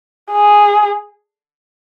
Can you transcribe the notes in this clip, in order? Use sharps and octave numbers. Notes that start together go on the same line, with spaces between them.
G#4